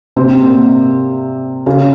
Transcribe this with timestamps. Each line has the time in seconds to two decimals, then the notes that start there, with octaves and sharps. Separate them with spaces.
0.16 C3 C4
0.41 A#2 A#3
1.66 C#3 C#4